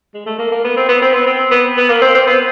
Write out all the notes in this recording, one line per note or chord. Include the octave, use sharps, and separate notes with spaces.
G#3
A3
A#3
A#3
B3
C4
B3
C4
B3
C4
B3
B3
A#3
C4
C4
B3